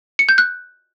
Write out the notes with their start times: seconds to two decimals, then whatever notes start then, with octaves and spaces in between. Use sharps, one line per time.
0.19 C#7
0.29 G6
0.38 F#6